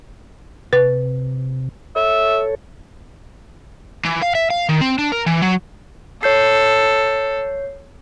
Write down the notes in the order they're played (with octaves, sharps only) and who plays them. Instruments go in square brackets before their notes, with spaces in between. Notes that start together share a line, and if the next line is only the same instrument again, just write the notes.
[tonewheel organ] C3 [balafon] B4
[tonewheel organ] A4 C#5 [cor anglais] E5
[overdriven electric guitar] E3
F5
E5
F5
D#3
C4
D4
A#4
E3
F#3
[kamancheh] A4 [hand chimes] C#5 G6 C7